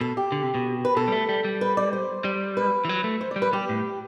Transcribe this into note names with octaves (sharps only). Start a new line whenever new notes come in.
B2 A4
G4
D3
C3
B2
B4
B2 A4
G3
A3
G3
G3
B4
D5
C5
G3
B4
E3
F#3
A3
C5
D5
G3
B4
G3 G4
A2